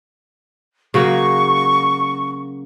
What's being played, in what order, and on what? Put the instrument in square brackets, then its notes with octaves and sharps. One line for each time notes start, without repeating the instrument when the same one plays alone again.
[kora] C#3 F#3 A#3 [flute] C#6